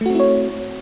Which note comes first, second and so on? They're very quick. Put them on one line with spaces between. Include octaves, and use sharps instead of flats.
A3 F#4 C4 E4 C#5